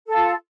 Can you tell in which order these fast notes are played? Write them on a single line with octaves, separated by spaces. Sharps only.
A4 F5 F4